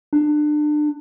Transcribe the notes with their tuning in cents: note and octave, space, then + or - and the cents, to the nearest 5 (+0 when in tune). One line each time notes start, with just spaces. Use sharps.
D4 +30